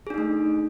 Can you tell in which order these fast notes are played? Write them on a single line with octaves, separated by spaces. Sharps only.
G#4 D4 D#4 A3